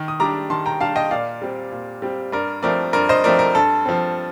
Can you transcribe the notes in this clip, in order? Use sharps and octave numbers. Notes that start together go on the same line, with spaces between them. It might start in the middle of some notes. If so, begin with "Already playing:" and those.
Already playing: D#3
D#6
G3 D4 A#5 D6
D#3 A5 C6
G5 A#5
G3 D4 F5 A5
D#5 G5
A#2 D5 F5
G3 C4
A#2
G3 C4
G2 A#4 D5
F3 A3 C4 A#4 D5
G2 A#4 D5
C5 D#5
F3 A3 C4 A#4 D5
A#4
G2 A4
F3 C4